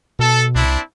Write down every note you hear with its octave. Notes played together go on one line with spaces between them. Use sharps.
B2 A4
C2 C4 D4 E4